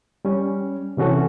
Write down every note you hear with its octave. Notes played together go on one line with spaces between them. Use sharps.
G3 C#4
C3 E3 C#4 F#4 A4